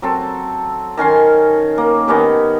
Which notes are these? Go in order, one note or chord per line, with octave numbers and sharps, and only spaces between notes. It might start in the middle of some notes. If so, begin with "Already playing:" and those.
F#3 C4 A4
D#3 C#4 G#5 C6
A#3
D#3 B3 C#4 G4